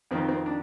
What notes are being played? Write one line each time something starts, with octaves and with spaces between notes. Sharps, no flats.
F2 D#3 C4
C4
D4